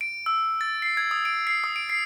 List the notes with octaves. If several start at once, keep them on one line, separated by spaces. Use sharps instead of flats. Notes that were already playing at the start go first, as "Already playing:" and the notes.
D7
E6
A6
C7
G#6
D#6
D7
C7
D#6
D7
C7